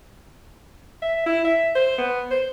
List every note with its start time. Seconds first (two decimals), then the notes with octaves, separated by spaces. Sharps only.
1.02 E5
1.26 E4
1.45 E5
1.75 C5
1.98 B3
2.31 C5